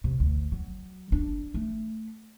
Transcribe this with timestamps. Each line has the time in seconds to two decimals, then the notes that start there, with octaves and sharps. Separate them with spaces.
0.04 C3
0.20 D2
0.52 F#3
1.12 D4
1.54 A3